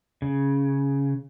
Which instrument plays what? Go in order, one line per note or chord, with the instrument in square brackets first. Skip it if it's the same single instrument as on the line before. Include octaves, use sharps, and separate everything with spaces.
[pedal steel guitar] C#3